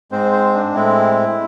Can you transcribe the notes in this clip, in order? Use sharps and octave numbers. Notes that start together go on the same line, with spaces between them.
G#2 G#3 C4 C5
C5
D4
A2 G#3 C4 E4